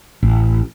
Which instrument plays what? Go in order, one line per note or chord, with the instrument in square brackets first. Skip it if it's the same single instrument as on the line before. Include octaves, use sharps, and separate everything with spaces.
[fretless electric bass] A1